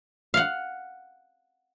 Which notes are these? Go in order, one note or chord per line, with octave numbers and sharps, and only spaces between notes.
F5 F#5